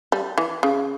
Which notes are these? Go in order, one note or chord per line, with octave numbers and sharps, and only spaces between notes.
G3
E3
C#3